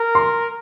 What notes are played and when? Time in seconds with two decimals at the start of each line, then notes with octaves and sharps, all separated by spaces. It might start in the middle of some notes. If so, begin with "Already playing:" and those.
Already playing: A#4
0.15 C6